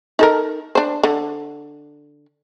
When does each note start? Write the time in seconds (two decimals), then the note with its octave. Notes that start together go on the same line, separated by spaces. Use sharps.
0.19 D#4 A4 A#4
0.75 D4 C5
1.03 D3